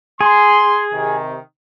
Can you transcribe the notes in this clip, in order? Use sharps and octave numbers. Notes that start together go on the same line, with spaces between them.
G#4 C6
C3 D#3